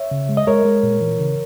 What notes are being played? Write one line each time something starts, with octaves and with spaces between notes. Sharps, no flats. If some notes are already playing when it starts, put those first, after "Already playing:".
Already playing: C#5 E5
C#3
G#3
D#5
G#3 A#4 C#5
G#3
A#2
E3
C#3